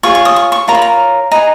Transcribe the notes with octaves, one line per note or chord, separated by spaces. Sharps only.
F4 G#4 C#5 C#6
C#6
D#6
C#6
C#6
F4 A#4 C#5 A#5
B5
A#5
G#4 B4 D#5 A#5